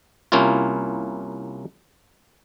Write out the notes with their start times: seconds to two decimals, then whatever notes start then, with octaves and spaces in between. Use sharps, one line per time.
0.32 C2 A#3 C#4 E4 F4